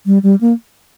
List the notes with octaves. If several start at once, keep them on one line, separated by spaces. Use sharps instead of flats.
G3
G3
A#3